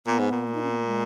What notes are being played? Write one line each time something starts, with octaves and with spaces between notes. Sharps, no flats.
A#2 B3
G#2
A#2
A#3
D#4
C#4
B3
A#3
G#3